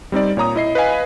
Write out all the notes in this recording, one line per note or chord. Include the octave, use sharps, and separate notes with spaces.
G3 C4 D#4 D5
A#2 C#5 A#5 D#6
E4 D#5 C7
B4 D#5 F5 G#5